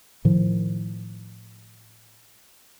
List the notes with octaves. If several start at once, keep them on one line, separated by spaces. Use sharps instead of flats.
A2 D#3 F3